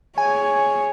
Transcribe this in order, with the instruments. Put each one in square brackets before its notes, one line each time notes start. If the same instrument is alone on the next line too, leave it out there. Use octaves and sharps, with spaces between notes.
[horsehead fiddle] G#4 C#5 [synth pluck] G#5